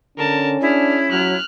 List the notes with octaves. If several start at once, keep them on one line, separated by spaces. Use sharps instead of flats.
D3 C#4 A#4 A5
D4 E4 G#4 F6
F#3 F6 F#6